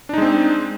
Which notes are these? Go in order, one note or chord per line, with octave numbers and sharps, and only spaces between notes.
G#3 C4 D4 D#4